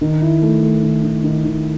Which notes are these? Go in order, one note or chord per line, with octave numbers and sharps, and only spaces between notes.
D#3
E4
A3
A3
D#3
D#3
D#3
D#3